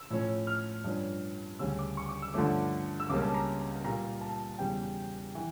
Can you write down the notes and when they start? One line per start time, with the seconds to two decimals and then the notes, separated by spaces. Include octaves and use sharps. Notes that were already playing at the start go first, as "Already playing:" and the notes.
Already playing: E6
0.10 A2 F3 C#4
0.47 F6
0.84 G2 F3 C#4
1.59 D2 C#3 G3 C#4 E6
1.79 D6
1.97 C#6
2.09 D6
2.22 E6
2.34 G2 D3 F3 A3 C#4 D6
3.00 E6
3.10 C#2 C#3 G3 A#3 C#4 D6
3.22 A5
3.34 A#5
3.84 A#2 G3 A#3 A#5
4.21 A5
4.59 E2 C#3 G3 G5
5.35 E3